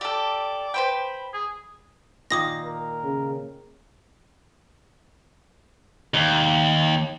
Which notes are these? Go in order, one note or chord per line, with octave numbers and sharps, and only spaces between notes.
G4 A4 D5
B4 C5 G5 B5
G#4
A#2 D#3 A#3 D6 D#6 A#6
A#4
C#3
D#2